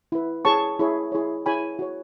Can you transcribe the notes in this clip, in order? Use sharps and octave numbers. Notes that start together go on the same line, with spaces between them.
E4 B4
E4 G#4 C#5 A5 C#6
E4 G#4 C#5
E4 G#4 C#5
E4 G#4 C#5 G#5 B5
F#4 C#5